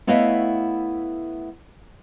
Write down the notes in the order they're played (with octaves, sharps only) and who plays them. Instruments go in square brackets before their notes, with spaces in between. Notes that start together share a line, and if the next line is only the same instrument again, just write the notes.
[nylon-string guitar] A3 B3 E4 C#5 D#5 F5